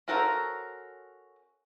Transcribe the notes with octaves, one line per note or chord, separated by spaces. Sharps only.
C#4 F#4 A4 A#4 C5